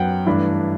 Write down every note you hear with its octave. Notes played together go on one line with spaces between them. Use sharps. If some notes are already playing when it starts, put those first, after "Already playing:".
Already playing: F#2 F#3 B3 F#5 G5
G2 E3 A3 D4 B5